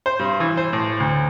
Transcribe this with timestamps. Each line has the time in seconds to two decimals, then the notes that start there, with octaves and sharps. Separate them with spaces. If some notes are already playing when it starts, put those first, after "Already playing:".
0.06 C5
0.19 G2
0.40 E3
0.57 C5
0.73 A2
1.00 D2